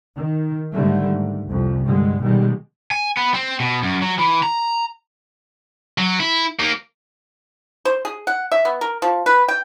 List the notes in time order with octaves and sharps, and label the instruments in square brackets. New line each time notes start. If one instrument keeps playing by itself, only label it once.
[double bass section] D#3
G#2 D3 D#3 G3 A3
G#2
C2 F2
G2 D3 G#3
B2 D#3 G3 G#3
[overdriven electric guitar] G#5
B3
C4
B2
F#2
F#3
E3
A#5
[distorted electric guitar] F#3
E4
A#3 D#4
[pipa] C5
G#4
F#5
E5
B3
A#4
F3
B4
G5